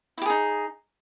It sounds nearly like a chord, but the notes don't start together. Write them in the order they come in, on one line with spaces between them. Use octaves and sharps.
E4 G4 G#4 D#4